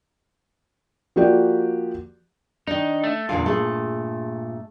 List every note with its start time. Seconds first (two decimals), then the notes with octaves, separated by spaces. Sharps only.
1.16 F3 A#3 F#4 G4 D5
2.67 D#3 D4 D#4
3.04 A3
3.29 E2 G2 A#2 D3 F5
3.46 A3 G#4